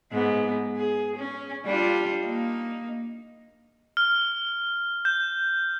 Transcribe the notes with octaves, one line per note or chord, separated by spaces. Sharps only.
G#2 B3
G#4
C#4
G3 D4 F4
A#3 D#4
F6
G6